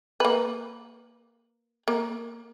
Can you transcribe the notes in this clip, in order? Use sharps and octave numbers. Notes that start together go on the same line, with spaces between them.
A#3 B4
A#3